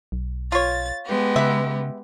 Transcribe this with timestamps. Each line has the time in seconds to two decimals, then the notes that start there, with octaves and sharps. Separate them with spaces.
0.12 B1
0.52 F4 C#5 A6
1.06 G#3 B3 G4
1.36 C#3 B4 E5